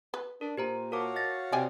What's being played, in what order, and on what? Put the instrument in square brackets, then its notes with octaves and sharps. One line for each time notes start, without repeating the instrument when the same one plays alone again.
[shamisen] B4
[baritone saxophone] D4 [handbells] A#4
[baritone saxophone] A#2 [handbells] G4 C5 A#5
[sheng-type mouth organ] F#4 C#5 F5 [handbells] A#4 A5 D6
[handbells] D#5 A6 A#6
[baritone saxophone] C3 [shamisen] D5 G5 G#5